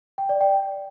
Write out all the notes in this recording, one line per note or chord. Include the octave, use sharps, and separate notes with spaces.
G5
D5
G5